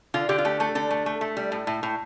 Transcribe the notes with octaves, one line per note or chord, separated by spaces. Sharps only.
D3 F4
D3 G4
F4
A3 G4
A3 A4
D3 A4
A3
A3
A3
G3
A2
A2
A2